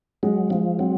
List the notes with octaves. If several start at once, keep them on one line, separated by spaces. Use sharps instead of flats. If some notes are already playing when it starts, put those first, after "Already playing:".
F#3 G#3
F3 G#3
F#3 C4